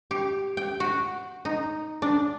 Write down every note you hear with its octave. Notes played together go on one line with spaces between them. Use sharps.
G4
G5
F#4
D#4
D4